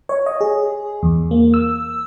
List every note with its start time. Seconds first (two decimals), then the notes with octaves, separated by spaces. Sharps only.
0.09 C#5
0.26 D#5
0.41 G#4
1.03 E2
1.31 A#3
1.54 E6